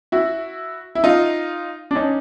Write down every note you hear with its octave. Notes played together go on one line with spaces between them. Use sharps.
E4 F#4
E4
D#4 F4
D4
C#4 D#4